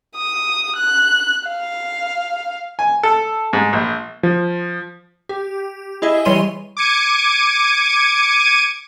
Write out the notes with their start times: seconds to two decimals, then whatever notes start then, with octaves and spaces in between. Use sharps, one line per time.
0.16 D#6
0.76 F#6
1.48 F5
2.79 G#5
3.03 A4
3.53 G#2
3.73 A#1
4.23 F3
5.29 G4
6.02 E4 G#4 D#5 E5
6.25 E3 G3 C#5 C6 D#7 G7
6.77 D6 G#6 C#7 D#7